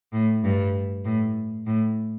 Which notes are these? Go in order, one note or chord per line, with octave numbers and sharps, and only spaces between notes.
A2
G2
A2
A2